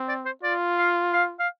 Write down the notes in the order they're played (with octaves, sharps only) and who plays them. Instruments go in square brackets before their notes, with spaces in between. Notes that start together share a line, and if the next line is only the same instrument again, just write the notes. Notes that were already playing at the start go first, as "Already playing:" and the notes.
Already playing: [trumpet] C4
[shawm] D5
C5
[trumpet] F4 [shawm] D5
[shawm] F5
F5
F5